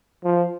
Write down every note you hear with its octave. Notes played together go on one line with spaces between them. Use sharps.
F3